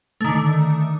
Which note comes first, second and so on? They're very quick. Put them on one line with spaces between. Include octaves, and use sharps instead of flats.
A3 D#3 D3